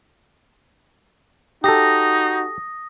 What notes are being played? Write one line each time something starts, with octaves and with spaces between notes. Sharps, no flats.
D#4 F#4 G4 A4 D#6 A#6